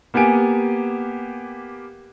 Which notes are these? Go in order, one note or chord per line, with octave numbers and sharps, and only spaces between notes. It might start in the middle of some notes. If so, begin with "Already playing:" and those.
A#3 B3 G4 G#5 D7